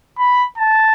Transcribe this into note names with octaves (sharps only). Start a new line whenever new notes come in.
B5
A5